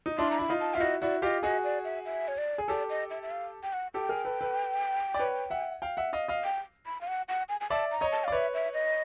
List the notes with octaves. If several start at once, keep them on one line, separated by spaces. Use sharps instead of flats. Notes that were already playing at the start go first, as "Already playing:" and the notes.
D#4
D4 E4 C6
A#5
E4 B5
D#4 F4
A5
F4 E5
E4 F#4 D#5
E4 F#4 D5
F4 G4 D#5
F#4 G#4 D#5
D5
E5
E5
C#5
D5
G#4
G4 A4 D5
D#5
E5
E5
F5
G5
F#5
G4 A4 G5
G#4 A#4
A4 B4
A4 B4
D5
B4 C#5
E5 F#5
F5 G5
E5 F#5
D#5 F5
D#5 F5
G5
B5
F5
F#5
F#5
G#5
G#5
D5 E5 A5
A#5
C#5 D#5
A5
D5 F5
B4 C#5 E5
E5
D#5